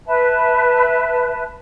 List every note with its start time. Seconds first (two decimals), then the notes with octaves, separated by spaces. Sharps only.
0.06 B4 E5 A5